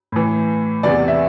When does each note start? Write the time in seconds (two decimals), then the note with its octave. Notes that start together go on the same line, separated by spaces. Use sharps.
0.12 A2 E3
0.83 E2 C3 E3 D5
1.08 E5